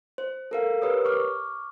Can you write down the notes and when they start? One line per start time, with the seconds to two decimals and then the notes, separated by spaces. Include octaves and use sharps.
0.18 C5
0.51 A4 A#4 F5
0.81 G4 A#4 B4 C#5 D#6 E6
1.05 C#6 D6 F6